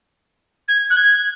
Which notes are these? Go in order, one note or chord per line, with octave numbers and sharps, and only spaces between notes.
G#6
F#6
G#6